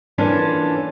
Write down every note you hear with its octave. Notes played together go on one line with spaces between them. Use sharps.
E3 A#3 C#4 D4 F4 A4